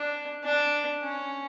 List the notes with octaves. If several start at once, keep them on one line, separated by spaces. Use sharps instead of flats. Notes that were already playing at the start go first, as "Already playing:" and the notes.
Already playing: D4
D4
C#4